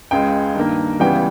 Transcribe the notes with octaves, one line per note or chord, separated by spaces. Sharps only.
C#2 C#3 G#3 G5
G2 D#3 A#3
C#2 C#3 E3 G3 B3 G5